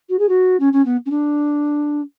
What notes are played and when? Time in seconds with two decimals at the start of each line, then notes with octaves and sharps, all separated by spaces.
0.09 F#4
0.19 G#4
0.28 F#4
0.59 C#4
0.72 C#4
0.85 B3
1.05 C#4
1.10 D4